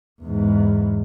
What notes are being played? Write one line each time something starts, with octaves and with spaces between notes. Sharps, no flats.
E2 G#2